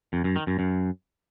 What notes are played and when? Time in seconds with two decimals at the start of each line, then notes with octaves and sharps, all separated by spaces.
0.13 F2
0.24 F#2
0.36 D#3
0.47 F#2
0.59 F#2